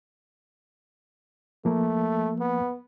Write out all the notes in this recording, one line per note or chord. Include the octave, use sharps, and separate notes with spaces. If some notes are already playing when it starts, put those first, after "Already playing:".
F3 A3 A#3
B3